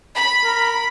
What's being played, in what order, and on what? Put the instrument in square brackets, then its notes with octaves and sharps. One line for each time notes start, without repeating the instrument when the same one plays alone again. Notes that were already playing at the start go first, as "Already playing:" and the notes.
[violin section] B5
[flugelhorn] A#4